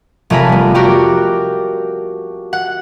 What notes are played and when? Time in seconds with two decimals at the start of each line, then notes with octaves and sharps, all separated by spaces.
0.30 F1 A3 A#4 G#5 B5
0.49 G3 B3
0.75 F#4 G4 A#4 D5 G5
2.53 F#5